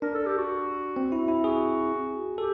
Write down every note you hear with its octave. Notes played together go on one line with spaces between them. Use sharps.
D4 A#4
A4
G4
F#4
C4
E4
E4
F#4 G#4
G4 A4